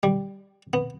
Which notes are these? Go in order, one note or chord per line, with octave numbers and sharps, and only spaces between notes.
G3
B3